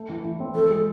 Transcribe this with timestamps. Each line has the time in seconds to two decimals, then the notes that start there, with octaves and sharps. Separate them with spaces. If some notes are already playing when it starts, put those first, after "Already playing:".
Already playing: A3
0.10 E3
0.25 E3
0.40 C4
0.55 F3 A4
0.70 G#3